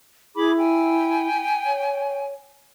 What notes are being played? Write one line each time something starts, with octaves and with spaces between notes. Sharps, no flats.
E4 G#4 B5 D6
G5 G#5
C#5